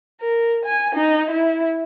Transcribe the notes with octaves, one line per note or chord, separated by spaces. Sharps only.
A#4
G#5
D#4
E4